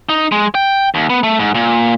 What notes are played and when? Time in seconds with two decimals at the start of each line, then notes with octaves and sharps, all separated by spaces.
0.09 D#4
0.32 G#3
0.55 G5
0.95 D#2
1.10 B3
1.23 A3
1.39 G#2
1.55 A#2